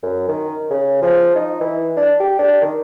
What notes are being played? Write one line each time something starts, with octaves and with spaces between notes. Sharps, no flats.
F#2
D#3
C#3
F3
D#4
E3
D4
G4
D4
D#3